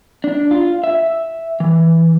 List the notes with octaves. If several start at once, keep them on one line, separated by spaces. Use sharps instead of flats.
D4
F4
E5
E3